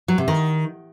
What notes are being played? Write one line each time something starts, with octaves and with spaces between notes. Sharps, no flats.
F#3
C3
D#3